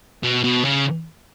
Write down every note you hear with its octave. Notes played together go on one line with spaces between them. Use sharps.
B2
B2
C#3